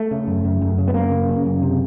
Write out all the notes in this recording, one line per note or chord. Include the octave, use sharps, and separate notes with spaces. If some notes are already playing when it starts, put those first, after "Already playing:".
Already playing: A3
C#3
F#2
F#2
F#2
C#3
B3
F#2 A#3
C#3
C#3
F#2
C3